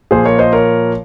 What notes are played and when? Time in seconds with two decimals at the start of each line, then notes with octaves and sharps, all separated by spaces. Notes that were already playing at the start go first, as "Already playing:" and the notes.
0.11 A#2 F3 G#4 C5
0.25 A#4 C#5
0.39 C5 D#5
0.53 A#4 C#5